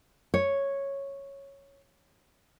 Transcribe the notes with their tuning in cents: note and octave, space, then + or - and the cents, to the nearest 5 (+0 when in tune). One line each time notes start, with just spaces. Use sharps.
C#5 -5